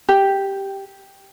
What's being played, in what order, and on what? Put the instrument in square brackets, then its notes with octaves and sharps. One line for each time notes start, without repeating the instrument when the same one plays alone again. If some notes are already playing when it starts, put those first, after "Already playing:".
[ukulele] G4